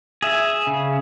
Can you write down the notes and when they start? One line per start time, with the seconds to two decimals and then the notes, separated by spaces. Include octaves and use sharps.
0.22 G#4 E5
0.67 C#3